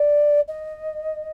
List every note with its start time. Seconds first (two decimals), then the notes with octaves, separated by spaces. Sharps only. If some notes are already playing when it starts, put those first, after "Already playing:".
Already playing: D5
0.47 D#5